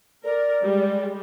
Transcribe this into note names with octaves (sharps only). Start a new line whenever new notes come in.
A#4 D5
G3 G#3